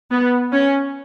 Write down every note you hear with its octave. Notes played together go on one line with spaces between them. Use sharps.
B3
C#4